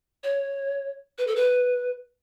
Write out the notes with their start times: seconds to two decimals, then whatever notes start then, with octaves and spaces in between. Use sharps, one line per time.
0.23 C#5
1.18 B4
1.27 A4
1.36 B4